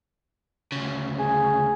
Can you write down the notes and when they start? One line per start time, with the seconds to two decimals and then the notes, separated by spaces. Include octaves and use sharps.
0.72 D2 C#3
1.19 G#4